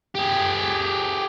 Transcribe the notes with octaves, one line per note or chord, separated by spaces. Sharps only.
G4 G#4